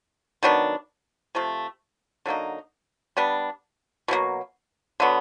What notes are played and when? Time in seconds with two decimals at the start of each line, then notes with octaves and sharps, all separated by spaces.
0.43 D#3 F#3 B3 D4
1.35 C3 F3 A3
2.26 D3 F#3 A#3 D#4
3.17 G3 B3 D4
4.08 B2 F#3 A#3
5.00 D3 F#3 B3